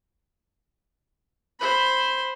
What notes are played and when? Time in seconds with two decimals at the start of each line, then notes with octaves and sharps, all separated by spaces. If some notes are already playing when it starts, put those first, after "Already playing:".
1.59 C5 B5